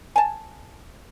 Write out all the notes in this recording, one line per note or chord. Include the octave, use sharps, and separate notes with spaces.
G#5 A5